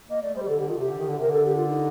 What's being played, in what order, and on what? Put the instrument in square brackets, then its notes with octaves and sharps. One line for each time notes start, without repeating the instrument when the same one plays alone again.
[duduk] A#3 [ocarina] D#5
[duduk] A3 [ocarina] D5
[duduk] G3 [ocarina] C5
[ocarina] G4
[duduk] D3 [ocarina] A4
[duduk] D3 [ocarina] G4
[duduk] D#3 [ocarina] F4
[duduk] C3 [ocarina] G4
[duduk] D3
D#3
D3
[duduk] C3 [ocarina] A#4
[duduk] D3 [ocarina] A4
[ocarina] G4
F4
D#4